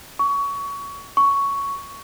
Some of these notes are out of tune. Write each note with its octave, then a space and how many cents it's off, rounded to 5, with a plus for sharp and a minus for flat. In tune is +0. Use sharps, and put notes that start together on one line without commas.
C#6 +20
C#6 +5